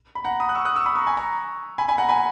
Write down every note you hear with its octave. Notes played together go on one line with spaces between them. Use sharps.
B5
F#5 A#5
B5 D#6
F#6
C#6 E6
D#6 F#6
C#6 E6
B5 D#6
A#5 C#6
G#5 B5
A#5 C#6
G#5 B5
G#5 B5
F#5 A#5
G#5 B5